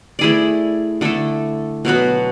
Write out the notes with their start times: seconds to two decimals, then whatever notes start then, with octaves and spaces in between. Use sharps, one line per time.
0.19 A3 E4 G#4 D5
1.01 D3 A3 E4 A4
1.85 B2 F#3 B3 F#4